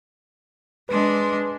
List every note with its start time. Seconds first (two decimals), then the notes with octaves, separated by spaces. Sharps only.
0.89 G#3 D4 B4 C6